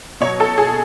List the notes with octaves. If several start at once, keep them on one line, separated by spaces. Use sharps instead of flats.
B2 F#3 C#5
A4
G#4